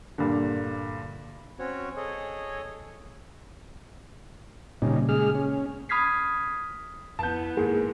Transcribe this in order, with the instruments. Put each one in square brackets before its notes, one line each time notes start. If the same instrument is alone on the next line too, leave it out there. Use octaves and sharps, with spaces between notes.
[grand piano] G2 A#2 D3
[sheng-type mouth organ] C4 C#4 F#4 C#5
G#4 A4 C#5 D#5
[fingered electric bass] A#2 C#3 [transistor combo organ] G3 C#4 D#4
[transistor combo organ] G#3 G#4 F6
C#4
[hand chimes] B5 D#6 F6 G#6 B6 C7
[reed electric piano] F2 [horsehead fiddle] B3 E4 [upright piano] A5 G6
[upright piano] G#2 D#3 [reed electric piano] A#3 G#4 A#4